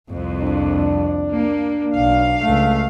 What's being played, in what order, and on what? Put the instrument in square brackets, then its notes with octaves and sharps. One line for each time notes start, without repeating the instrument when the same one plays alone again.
[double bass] C2 [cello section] F2
[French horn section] D4
[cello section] A#3
[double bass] B1 [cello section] F5
[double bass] C#2 A3